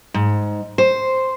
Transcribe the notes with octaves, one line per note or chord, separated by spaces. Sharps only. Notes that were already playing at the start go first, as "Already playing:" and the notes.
G#2
C5